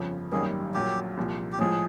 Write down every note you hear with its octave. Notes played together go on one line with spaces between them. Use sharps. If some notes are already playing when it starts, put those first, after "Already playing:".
Already playing: G1 F2 C#3 F3
G#1 F#2 D#3 G3 A#3 G#4
A#1 A#2 F#3 G4
C2 A#2 F3
G4
A2 F3 G#3 G#4